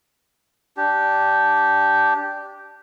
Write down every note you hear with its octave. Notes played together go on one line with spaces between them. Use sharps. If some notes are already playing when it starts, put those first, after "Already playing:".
D4 G4